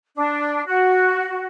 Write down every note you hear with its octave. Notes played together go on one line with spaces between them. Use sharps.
D4
F#4